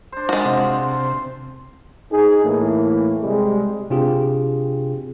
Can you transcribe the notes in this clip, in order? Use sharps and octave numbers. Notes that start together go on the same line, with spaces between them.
D4 C5
G#3 F4 F#4
C3 C5
D#4 G#4
A2 E3 A#3
C3 G3 G#3
C3 C4 D4 F4 G4 G#4